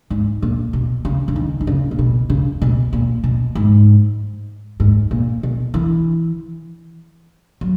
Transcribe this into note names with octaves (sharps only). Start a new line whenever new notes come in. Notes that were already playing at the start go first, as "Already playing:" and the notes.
G#2
A#2
B2
C#3
C#3
D#3
D#3
C#3
A#2
B2
C#3
B2
A#2
B2
G#2
G#2
A#2
B2
E3
F#3